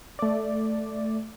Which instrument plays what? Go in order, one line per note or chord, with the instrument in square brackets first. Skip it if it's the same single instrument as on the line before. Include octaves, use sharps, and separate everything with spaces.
[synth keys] A3 D5